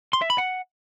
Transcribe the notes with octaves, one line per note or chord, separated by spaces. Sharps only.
C6
E5
B5
F#5